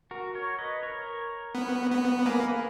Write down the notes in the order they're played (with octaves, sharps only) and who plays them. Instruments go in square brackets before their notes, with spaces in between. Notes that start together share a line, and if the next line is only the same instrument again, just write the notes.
[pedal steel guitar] F#4 A#4
A#4 C#5
B4 D#5
A#4 C#5
[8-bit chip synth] B3
B3
[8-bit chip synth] A#3 [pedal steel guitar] G#4 B4